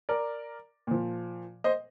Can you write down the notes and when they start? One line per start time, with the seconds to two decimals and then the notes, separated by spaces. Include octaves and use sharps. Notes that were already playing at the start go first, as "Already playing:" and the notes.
0.09 A#4 D5
0.87 A#2 F3
1.64 C5 D#5